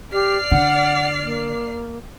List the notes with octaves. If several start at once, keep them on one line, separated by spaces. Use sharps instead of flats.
G4 D5 F6 C7
D3 F#5
A#3